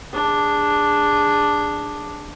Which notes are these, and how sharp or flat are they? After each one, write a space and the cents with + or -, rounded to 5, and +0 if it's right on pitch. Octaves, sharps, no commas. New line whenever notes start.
D4 +0 G#4 -15